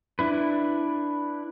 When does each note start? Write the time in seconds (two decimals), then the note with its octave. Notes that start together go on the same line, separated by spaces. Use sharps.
0.19 D4 E4 B4